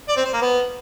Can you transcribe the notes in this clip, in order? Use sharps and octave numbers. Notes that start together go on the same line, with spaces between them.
D5
C4
C5
A#3
B3